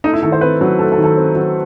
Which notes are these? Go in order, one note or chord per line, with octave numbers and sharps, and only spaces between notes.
A3 D#4
E4
D#3 A4
C5
C4 B4
F#3
A3 A4
A4
D#3
A4
C4
F#3